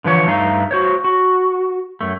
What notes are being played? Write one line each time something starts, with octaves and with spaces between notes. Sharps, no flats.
D3 E3 F3 C#5
G2 A3 D#4 F5
F#4 C5 C#5
F#4
F#2 A3